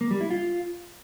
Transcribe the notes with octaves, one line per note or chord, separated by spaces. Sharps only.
A#3
G3
E4
F4